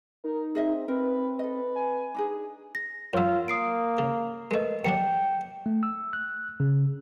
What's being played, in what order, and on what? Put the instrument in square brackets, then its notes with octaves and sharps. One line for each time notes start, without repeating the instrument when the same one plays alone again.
[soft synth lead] D#4 [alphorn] A#4
[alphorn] C4 [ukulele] G#4 D#5 E5
[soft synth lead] C4 [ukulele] A#4 [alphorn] B4
[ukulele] A4 D#5 [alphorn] B4
[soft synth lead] G#5
[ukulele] D4 D#4 G#4
[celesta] A#6
[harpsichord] F#2 F#3 [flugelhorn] F4 [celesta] C#5 E6
[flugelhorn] A#3 [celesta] D#6 C7 D7
[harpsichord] C#3
[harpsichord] G#3 A3 [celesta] A#4 B4 D#5
[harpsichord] D#2 F#3 D4 [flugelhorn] G5 [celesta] C#7
[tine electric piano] A3
E6
F#6
C#3